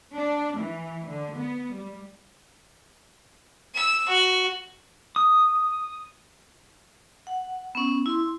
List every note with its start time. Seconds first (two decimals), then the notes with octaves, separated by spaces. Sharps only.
0.15 D4
0.57 E3
1.08 D3
1.37 B3
1.73 G3
3.75 E6
4.09 F#4
5.16 D#6
7.27 F#5
7.75 B3 C#4
8.06 E4 C6